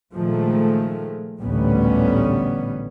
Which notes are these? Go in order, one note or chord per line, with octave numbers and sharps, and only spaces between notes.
A#2 D#3 F3 G#3 A3
A1 D2 A#2 G3 B3 C#4